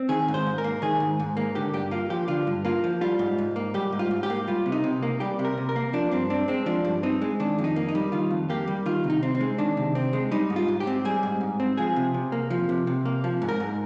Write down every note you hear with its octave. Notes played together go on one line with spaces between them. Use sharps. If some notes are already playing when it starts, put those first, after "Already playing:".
Already playing: C4
D#3 G#4
G#2
C5
G#2
A#4
A#3
D#3 G#4
G#2
G#2
A#3
D3 G4
G2 G4
A#3 F4
F3 G4
D3 F4
G2
A#3 F4
F3
G3 F4
G#2
G#2
A#3
G3 G4
G#2
F4
G#2
G4
A#3
G3 F4
C3
D#4
C3
A#3
G3 G4
C3
A#4
C3
A#4
A#3
F3 D4
G2 C4
C4 D4
G#3 C4
F3 D4
G2
C4 D#4
G#3
D#3 D4
F2
D#4
A#3
D#4
G3
D#3 F4
F2
A#3 G4
G3
D#3 F4
C3
D#4
C4
C4
G#3
D#3 D4
C3
C4
G#3
G3 D#4
G#2
F4
G#2
G4
C4
G3 G#4
G#2
G#2
C4
F3 G#4
C3
C3
A#3
F3
C3
C3
A#3
F3
G#2
A#4
G#2